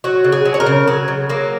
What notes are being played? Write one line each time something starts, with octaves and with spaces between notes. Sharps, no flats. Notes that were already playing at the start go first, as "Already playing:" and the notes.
F#3 F#4
C#3
G#4
F#3
C#5
A#4
C#3
F#3 G#4
C#3
F#3 A#3